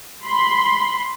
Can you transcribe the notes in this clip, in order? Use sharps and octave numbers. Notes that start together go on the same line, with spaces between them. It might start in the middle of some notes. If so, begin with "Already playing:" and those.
B5 C6